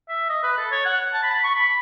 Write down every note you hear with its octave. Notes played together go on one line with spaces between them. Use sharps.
E5
D#5
B4
A4
C#5
F#5
A5
B5
A5
B5
C#6
B5